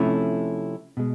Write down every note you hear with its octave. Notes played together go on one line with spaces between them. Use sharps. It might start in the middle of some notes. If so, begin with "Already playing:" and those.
Already playing: C3 F3 A3 C#4 E4
B2 G#3